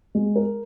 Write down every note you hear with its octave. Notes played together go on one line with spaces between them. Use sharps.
G#3
A#4